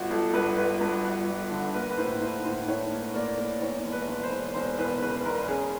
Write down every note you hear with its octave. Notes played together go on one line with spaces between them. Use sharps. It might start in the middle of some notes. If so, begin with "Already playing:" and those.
Already playing: G1 F#4
G1 A4
G2 B4
G1 B4
G2
G1
G1
D3
A#3 B4
B4
A2 C5
A2 C5
A2 C5
A2 C#5
A#3
A#3 D5
A#3
E2 C#5
E1
B4
E1
C5
E1
E1 C5
E2 B4
C#3 B4
E1 A#4
C#4 G#4